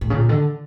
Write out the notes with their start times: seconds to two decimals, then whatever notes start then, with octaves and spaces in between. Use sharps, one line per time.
0.01 A2
0.10 C#3
0.15 A#2
0.29 D3